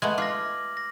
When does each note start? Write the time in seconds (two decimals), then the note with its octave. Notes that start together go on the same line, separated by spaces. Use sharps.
0.02 G#3 A3 B3 G#6 F#7
0.18 F4 D6 F6 A#6
0.77 A#6